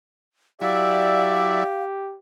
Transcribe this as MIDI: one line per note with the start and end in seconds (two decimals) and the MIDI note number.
0.61 1.64 54
0.61 1.64 64
0.61 2.17 67
0.61 1.62 74
0.61 1.62 76
0.61 1.84 77